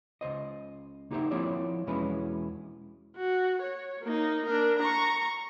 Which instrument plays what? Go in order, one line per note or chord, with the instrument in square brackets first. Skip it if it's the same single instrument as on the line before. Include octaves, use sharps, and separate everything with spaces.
[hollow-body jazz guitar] C#2 C5 D#5
A#3 D#4 G4 B4 C5 E5
F3 A#3 C4 E4 C#5 D5
E2 B2 G#3 C#4 E4 B4
[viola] F#4
C#5
A#3 D#4
D4 A#4
A#5 C#6